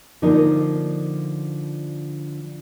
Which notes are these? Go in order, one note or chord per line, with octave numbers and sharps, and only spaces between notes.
D3 F3 A#3 D#4 A#4